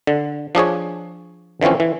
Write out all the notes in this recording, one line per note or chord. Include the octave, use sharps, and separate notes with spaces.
D3
F3 D4 G#4 C#5
D3 E3 F3 C4 C#4
E3